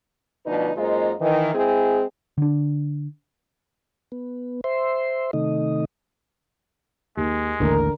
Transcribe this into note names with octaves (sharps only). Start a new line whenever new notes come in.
D2 B2 F3 D4 D#4 B4
F#2 G#3 A#3 D#4 F4 C5
D#3 E3
G#3 C4 E4 G#4
D3 D4
B3
C5 E5 C6
C3 D#3 A3 D#4 D#5
D#2 G#3
A1 D#2 A2 D3 A#4